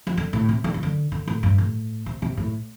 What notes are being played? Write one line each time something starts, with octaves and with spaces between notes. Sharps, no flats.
F3
D3
A2
C3
D3
F3
D3
D3
A2
G2
A2
C3
C3
A2